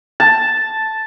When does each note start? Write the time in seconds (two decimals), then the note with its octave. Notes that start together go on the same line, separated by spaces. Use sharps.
0.20 A5